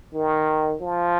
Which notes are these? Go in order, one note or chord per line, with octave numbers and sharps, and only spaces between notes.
D#3
F3